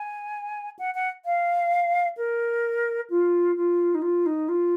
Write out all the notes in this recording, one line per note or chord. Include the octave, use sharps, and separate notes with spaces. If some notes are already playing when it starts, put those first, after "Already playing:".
Already playing: G#5
F#5
F#5
F5
A#4
F4
F4
D#4
F4
D#4
F4